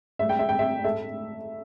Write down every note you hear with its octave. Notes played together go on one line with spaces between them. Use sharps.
A2 G3 E5
G5
E5
G5
E5
A2 A3 E5